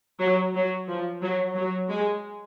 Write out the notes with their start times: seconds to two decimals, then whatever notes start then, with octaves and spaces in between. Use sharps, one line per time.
0.20 F#3
0.55 F#3
0.88 F3
1.22 F#3
1.56 F#3
1.91 G#3